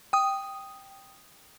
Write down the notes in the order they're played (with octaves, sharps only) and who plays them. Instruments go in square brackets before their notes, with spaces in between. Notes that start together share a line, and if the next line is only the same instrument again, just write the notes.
[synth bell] G5 D#6